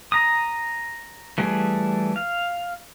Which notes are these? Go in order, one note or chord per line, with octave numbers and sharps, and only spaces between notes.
A#5 D#6
E3 G3 A3 G#4
F5